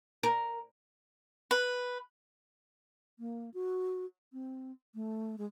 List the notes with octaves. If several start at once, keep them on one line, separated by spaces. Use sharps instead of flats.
A#4
B4
A#3
F#4
C4
A3
G#3